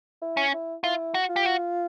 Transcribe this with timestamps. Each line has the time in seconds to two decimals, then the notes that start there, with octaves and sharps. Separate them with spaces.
0.22 E4
0.37 C#4
0.53 E4
0.83 E4 F4
1.14 F#4
1.29 F4
1.36 G4
1.46 F#4